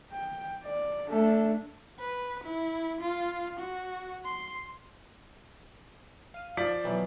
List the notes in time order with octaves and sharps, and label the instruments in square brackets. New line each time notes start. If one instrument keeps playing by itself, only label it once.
[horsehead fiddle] G5
D5
A3 D4
[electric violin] B4
E4
F4
F#4
C6
[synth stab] F5 D#7
[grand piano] F3 D5 B6
[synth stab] B2 E3 F#3